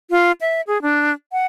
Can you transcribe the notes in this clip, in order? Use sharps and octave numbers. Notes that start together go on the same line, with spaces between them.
F4
E5
G#4
D4
F#5